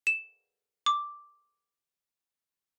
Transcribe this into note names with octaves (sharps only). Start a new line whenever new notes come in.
E7
D6